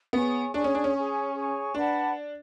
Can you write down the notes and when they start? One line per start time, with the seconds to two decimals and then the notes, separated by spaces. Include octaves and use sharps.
0.13 B3 G#4 C#5 G#5 C#6
0.54 D4 G#4 C#5 G#5 C#6
0.64 C#4
0.75 D4
0.84 C#4
0.94 G#4 C#5 G#5 C#6
1.34 G#4 C#5 G#5 C#6
1.74 D4 B4 D5 F#5 A5